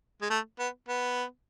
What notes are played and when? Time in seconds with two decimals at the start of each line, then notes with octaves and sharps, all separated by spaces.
0.22 G#3
0.30 A3
0.59 B3
0.89 B3